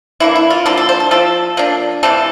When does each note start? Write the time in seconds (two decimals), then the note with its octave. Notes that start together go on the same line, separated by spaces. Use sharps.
0.20 E3 A#3 D4 E4
0.35 E4
0.50 F4
0.66 D3 F3 A#3 D4 A4
0.77 A4
0.89 C5
1.00 A4
1.11 F3 C4 A4
1.57 F3 A#3 D4
2.03 C3 E3 A3 C4 A4